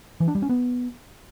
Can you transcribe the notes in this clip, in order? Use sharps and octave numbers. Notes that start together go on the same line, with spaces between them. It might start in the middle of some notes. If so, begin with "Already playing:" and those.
E3
D4
G3
C#4
B3